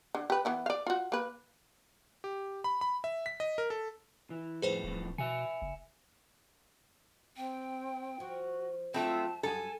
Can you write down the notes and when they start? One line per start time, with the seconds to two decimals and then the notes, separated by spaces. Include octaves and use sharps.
0.15 D3
0.30 G4 B4
0.45 E3 B3 E4
0.66 D5 F5
0.87 F4 F#4
1.12 A#3 B4
2.24 G4
2.64 B5
2.81 B5
3.04 E5
3.26 B6
3.40 D#5
3.58 A#4
3.70 A4
4.30 E3
4.62 F2 A2 G#4 B4 C5
4.84 D1 F2 A2
5.18 B2 E5 G#5 C#7
5.62 F#1
7.37 C4 G5
8.20 F3 F#4
8.94 F#3 A3 C4 F4 A5
9.43 F#2 G3 F#4 A4 G#5 A5